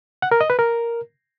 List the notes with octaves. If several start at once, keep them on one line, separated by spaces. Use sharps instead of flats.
F#5
A#4
D#5
B4
A#4